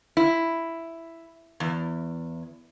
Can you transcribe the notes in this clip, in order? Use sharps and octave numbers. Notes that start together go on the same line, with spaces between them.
E4
E2